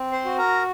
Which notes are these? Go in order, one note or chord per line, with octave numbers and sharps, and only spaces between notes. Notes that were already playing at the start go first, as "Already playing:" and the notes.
Already playing: C4
C5 C6
F#4
A#4 A#5